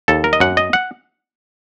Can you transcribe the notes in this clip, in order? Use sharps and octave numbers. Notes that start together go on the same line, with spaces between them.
D#2 A4
A#4
D#5
F#2 F#5
D#5
F#5